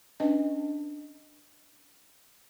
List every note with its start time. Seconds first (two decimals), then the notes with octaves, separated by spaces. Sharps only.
0.20 C#4 D4 B4 D#5